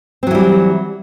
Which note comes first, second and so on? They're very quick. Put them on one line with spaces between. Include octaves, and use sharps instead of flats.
C4 F#3 E3 G3